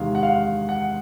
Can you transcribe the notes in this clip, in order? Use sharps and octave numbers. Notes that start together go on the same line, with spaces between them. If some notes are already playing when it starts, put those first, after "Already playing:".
Already playing: E2 C3 D#3 G#3 F5
F#5
F5
F#5